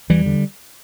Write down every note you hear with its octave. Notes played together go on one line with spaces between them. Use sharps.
E2 E3 G3
D3